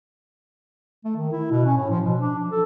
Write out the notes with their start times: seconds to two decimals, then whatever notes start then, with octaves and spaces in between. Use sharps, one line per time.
1.05 A3
1.17 D#3
1.32 E4
1.51 B2
1.65 C#4
1.77 A2
1.90 F3
2.05 B2
2.18 D4
2.38 F3
2.52 A4